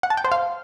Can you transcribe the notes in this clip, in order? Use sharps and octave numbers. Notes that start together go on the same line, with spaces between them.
F#5
A5
G5
C5
F5